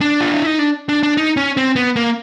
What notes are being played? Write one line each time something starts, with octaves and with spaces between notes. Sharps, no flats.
D4
F4
E4
D#4
D4
D4
D4
D#4
C#4
C4
B3
A#3